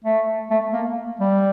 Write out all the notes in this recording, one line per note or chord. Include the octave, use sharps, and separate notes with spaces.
A3
A3
A#3
G3